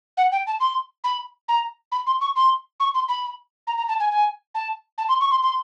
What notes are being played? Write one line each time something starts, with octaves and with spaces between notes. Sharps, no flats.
F#5
G5
A5
C6
B5
A#5
B5
C6
C#6
C6
C#6
C6
B5
A#5
A#5
A5
G#5
G#5
A5
A5
C6
C#6
C6
C6